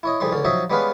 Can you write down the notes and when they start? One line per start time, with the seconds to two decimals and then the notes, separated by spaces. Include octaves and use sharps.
0.03 E4 C#5 D#5
0.20 C2 F2 G3 G#4 C6
0.32 C#2 D3 C#4
0.44 F3 F#3 D#4 C#5 D#5 E5
0.70 G3 G#3 B3 C#4 B4 F5